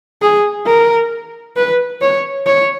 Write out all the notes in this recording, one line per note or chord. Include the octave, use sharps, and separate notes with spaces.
G#4
A#4
B4
C#5
C#5